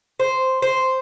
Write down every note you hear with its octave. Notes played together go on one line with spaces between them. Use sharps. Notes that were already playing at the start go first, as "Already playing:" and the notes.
C5
C5